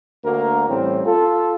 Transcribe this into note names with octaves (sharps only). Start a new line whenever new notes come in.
D2 A#3 F#4 A#4
A2 E3 G3 C4 C#4
F4 A4